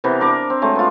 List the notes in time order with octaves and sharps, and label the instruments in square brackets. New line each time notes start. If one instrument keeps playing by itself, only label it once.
[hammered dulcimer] C3 E3 B3 A#4
D4 A#4 D6
C4
F#3 G#3 A3 C4
B3 F4